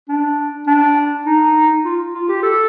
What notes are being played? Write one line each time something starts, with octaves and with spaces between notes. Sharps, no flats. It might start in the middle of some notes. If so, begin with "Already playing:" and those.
D4
D4
D#4
F4
F4
G4
A4